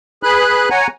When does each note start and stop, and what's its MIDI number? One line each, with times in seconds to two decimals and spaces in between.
0.23 0.69 68
0.23 0.69 71
0.23 0.69 83
0.23 0.69 90
0.70 0.87 73
0.70 0.87 78
0.70 0.87 80
0.70 0.87 82